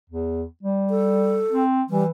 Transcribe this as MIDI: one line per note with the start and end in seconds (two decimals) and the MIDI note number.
0.10 0.45 40
0.63 1.44 55
0.90 1.63 69
1.52 1.82 60
1.90 2.10 52
1.90 2.04 55